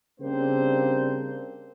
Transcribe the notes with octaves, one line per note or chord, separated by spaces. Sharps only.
C#3 G3 A#3 C4 D4 C5